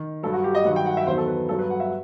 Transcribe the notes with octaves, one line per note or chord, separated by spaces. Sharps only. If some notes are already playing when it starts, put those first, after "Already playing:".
Already playing: D#3
G2 F#3 A4
F#4
G4
D#5
G2 D#3 F#3 F#5
G5
F#5
E5
E2 D#3 F#3 C5
A4
B4
G2 F#3 A4
B4
F#5
E5